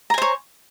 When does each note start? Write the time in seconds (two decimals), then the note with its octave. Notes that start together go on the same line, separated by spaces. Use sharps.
0.10 A#5
0.14 G#5
0.18 C5
0.22 C#5